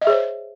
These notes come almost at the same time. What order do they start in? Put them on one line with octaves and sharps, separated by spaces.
D#5 E5 G#4 C#5 C5